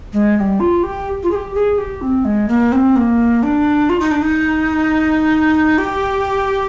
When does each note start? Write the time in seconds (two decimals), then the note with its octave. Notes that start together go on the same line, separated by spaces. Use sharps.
0.13 G#3
0.37 G#3
0.40 G3
0.60 F4
0.83 G4
1.23 F4
1.31 G#4
1.35 G4
1.55 G#4
1.78 G4
2.02 C4
2.25 G#3
2.48 A#3
2.72 C4
2.96 A#3
3.43 D4
3.89 F4
4.00 D#4
4.11 D4
4.22 D#4
5.78 G4